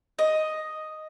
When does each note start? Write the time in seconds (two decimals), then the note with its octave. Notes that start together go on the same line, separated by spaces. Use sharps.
0.19 D#5